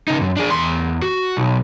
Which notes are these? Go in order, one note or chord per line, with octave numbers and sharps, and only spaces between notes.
C#3 D#4
F#2
D4 G#4
E2 C6
F#4
B1